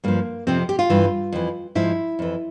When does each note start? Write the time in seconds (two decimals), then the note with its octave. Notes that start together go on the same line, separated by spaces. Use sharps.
0.04 G2 F3 A#3
0.47 F2 C3 F3 C4
0.69 G4
0.79 F4
0.90 G2 E3
1.32 F2 E3
1.75 G#2 F3 E4
2.19 F2 E3